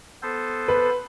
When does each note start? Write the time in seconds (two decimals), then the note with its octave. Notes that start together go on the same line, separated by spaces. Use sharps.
0.23 B3 A4 C5
0.68 B4